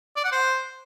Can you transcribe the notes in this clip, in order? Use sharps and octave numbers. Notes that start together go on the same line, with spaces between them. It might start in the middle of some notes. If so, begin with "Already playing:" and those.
D5
F#5
C5